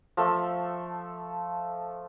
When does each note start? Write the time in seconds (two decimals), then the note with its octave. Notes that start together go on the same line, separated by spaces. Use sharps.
0.17 F3 A3 E5